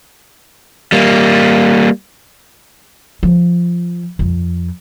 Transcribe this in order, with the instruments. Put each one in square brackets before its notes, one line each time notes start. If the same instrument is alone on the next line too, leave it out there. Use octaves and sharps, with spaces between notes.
[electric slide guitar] G3 A#3
[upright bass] F3
F2